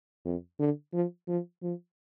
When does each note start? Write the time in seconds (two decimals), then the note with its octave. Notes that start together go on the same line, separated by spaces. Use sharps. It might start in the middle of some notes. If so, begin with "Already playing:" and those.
0.25 F2
0.60 D3
0.94 F3
1.29 F3
1.63 F3